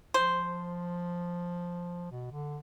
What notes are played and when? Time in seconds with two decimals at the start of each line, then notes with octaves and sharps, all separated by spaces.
0.14 F3 C5
2.11 B2
2.31 D3